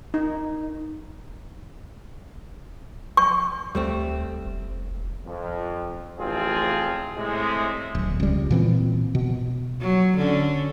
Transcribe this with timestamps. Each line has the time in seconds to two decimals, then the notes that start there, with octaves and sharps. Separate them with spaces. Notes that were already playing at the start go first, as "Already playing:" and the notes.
0.14 D#4
3.17 C#6
3.75 D2 G3 A3 C4
4.46 F1
5.25 F2
6.19 A1 F3 C4 F4 G#4
7.17 A2 C3 G#3
7.95 D1
8.20 C#2 G3
8.51 A#2 E3 C4
9.15 B2
9.80 F#3
10.17 D3 C#4